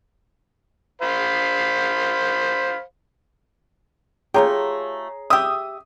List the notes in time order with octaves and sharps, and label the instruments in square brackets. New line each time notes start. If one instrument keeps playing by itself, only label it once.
[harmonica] C5 F5 B5
[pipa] A3 F4 G4 [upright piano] G#4 A#5 [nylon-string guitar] C#5
[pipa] G4 E5 [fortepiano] D#6